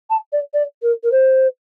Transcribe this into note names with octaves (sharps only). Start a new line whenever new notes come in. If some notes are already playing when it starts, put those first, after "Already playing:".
A5
D5
D5
A#4
A#4
C5